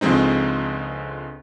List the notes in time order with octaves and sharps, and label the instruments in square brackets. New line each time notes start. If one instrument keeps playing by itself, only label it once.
[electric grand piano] C#2 D3 F3 G#3 C4 D#4